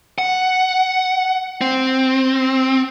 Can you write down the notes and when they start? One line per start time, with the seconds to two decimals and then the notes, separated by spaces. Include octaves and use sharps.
0.19 F#5
1.61 C4